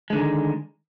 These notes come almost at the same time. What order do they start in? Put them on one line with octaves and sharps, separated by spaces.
G#3 D3 D#3